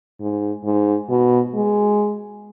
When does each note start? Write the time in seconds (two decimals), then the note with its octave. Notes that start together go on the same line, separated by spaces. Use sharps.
0.20 G#2
0.65 G#2
1.09 B2
1.54 G#3